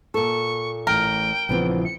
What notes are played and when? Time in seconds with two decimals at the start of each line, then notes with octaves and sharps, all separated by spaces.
0.14 A#2 A4 C#6
0.87 A1 A2 A#4 G5
1.49 A#1 C#3 E3 F3 B3 C4
1.85 C#7